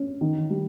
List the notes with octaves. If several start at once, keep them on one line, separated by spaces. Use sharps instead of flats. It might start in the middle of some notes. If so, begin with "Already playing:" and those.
Already playing: C#4
D#3
G3